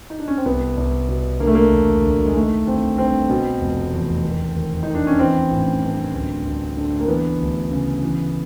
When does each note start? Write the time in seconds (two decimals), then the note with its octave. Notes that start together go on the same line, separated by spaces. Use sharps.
0.10 D#4
0.19 D4
0.28 C#4
0.37 C4
0.45 C2 B3
0.77 C2
1.08 B2
1.40 D3 A#3
1.47 A3
1.55 A#3
1.72 E1
2.03 D2
2.27 G#3
2.35 D#3 A3
2.66 G1 C4
2.98 G2 C4
3.29 B2
3.61 F1
3.93 E2
4.24 D#2
4.56 D#2
4.83 D#3 D#4
4.95 D4
5.07 C#4
5.19 E3 C4
5.50 A1
5.82 G2
6.14 D2
6.45 D2
6.77 D3
7.00 A#3
7.08 E3 B3
7.40 D2
7.71 C#3
8.03 E3